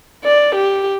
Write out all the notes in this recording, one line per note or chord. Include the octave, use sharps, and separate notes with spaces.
D5
G4